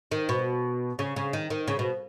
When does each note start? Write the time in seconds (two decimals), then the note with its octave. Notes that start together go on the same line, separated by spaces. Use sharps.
0.12 D#3
0.29 B2
0.99 C#3
1.16 C#3
1.33 D#3
1.50 D#3
1.68 C#3
1.79 B2